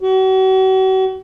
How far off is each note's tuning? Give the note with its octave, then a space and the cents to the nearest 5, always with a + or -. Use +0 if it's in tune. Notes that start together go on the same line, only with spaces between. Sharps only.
F#4 +40